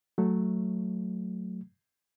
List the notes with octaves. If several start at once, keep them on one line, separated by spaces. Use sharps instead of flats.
F#3 A3